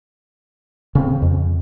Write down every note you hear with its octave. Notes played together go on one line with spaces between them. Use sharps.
C#3 C4
F2